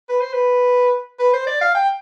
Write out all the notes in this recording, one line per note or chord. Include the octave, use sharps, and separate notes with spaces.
B4
C5
B4
B4
C5
D5
F5
G5